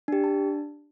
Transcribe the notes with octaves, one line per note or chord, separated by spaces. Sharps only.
D4 G4
D4 A5